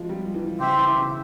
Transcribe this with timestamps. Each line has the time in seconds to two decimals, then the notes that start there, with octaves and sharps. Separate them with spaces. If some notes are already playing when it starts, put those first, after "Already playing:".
Already playing: F3 G#3
0.09 G3
0.34 E3
0.59 C#3 C4 G4 C5 E5
0.77 E3
0.96 C#3